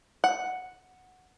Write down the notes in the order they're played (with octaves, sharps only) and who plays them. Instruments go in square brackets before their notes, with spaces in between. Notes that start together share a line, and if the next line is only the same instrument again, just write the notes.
[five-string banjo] F#5